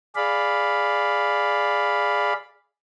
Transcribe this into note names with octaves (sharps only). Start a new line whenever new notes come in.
G#4 D5 F5 B5